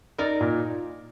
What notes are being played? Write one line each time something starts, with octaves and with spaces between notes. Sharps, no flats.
D#4 A#4 D5
A#2